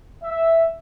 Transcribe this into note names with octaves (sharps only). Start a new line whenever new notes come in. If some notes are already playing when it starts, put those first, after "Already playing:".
E5